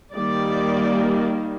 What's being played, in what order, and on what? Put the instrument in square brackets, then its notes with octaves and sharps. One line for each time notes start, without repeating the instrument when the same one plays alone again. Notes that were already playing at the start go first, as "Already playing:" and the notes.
[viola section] D#3 G3 A#3 D5